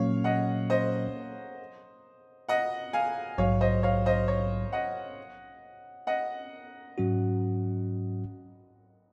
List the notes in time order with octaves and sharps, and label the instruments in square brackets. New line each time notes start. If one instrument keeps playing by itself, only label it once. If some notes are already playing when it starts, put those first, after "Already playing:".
Already playing: [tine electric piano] A#2 F#3 A#3 C#4 [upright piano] C#5 F5
[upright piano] D#5 F#5
C5 D#5
D#5 F#5
F5 G#5
[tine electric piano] A#1 G#2 F#3 [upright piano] C#5 F5
[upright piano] C5 D#5
C#5 F5
C5 D#5
C#5
D#5 F#5
D#5 F#5
[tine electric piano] G#2 F#3 C#4 F#4